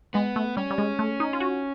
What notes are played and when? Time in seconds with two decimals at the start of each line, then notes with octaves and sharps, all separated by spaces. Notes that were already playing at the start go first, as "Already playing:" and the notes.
0.14 G#3 B3
0.36 A3
0.57 G3 C#4
0.70 G3
0.78 G#3
0.99 A3
1.20 D#4
1.33 F4
1.40 F#4